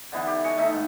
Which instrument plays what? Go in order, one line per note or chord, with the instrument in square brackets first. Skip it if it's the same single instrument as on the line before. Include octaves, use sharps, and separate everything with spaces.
[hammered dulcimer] D3 E3 B3 D#4
G4
D#5 G#5 A5 C#6
D#3 A3 D#4 E5
G#2